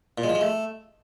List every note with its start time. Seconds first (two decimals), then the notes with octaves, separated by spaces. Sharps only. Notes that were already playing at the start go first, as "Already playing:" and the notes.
0.18 A#2
0.23 G#3
0.29 F3
0.35 G#3
0.41 A3